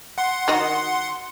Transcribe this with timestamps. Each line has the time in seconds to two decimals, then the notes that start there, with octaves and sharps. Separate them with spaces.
0.18 F#5 C6
0.48 D#3 F#4 D#5